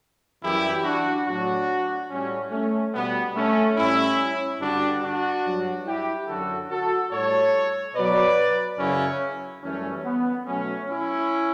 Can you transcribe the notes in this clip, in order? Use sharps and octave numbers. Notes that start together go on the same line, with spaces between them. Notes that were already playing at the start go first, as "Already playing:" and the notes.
F#2 E3 G3 E4 G4
D4 F#4
A2 F#3 D4 F#4
A2 G3 A3 C#4
A3 C#4
B2 G3 B3
A3 C#4
A2 G3 C#4 E4
G2 D3 G3 D4 F#4
D4 F#4
G2 F#3
E4 G4
F#2 D3 F#3 F#4 A4
F#4 A4
A2 G3 A4 C#5
B2 F#3 B4 D5
F#2 C#3 F#3 C#4 E4
F#2 E3 G3 A3 C#4
B3
B2 F#3 A3 C#4
C#4 E4